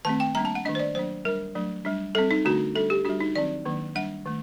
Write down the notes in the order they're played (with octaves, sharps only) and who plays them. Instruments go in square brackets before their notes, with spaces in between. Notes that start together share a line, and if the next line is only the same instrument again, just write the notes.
[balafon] D#3 A3 C4 A5
G5
G3 A#3 D4 A#5
A5
F#5
D#3 A3 D4 D#5
C5
D5
F#3 A#3 D4 C5
G3 D4 A#4
F#3 A3 D4
G3 D4
G3 C4 A4
D#4
D3 A3 D4 F#4
G3 D4 A4
G4
G3 D4 F#4
D#4
D#3 F#3 C4 D5
D#3 F#3 A#3 D4
G3 D4 F#5
D#3 A3